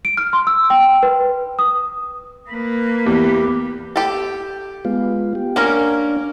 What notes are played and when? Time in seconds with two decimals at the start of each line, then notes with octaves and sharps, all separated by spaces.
0.05 D7
0.17 F6
0.33 C6
0.47 E6
0.70 G5
1.03 B4
1.59 D#6
2.50 A#3 B4
3.06 E2 G4
3.96 G4 A4
4.85 G#3 B3 F4
5.35 G4
5.56 A#3 C#4 D4 A#4